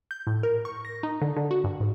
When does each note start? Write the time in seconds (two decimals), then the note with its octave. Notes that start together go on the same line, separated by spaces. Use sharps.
0.11 G6
0.27 A2
0.43 A#4
0.65 C#6
0.85 A#6
1.03 D#4
1.22 D3
1.37 D3
1.51 F#4
1.64 G2
1.80 G#2